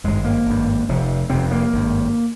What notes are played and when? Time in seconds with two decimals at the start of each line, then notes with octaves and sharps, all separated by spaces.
0.04 G#1 G2 G#3
0.24 A#3
0.46 G#1 G2
0.89 F1 F2 C3
1.30 F1 F2 C3 C4
1.51 A#3
1.73 G#1 G2